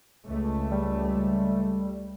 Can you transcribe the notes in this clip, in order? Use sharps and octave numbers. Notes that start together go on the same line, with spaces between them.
C#2 A3
G3